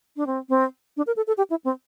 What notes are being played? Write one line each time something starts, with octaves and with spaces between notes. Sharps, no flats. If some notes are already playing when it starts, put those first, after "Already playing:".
D4
C4
C4
D4
A#4
A4
A4
G4
E4
C4